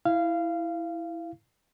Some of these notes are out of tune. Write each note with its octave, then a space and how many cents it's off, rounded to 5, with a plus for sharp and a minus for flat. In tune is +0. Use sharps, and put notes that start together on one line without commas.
E4 +0 F5 -15